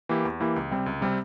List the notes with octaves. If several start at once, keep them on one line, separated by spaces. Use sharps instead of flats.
E3 A#3 E4 G4
E2
E3 A#3 E4 G4
C#2
C3 G3 C4
C#2
C3 G3 C4